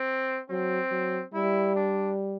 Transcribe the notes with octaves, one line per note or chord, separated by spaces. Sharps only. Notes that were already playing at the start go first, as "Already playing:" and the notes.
Already playing: C4
F#3 C4
F#3
G3 E4
D4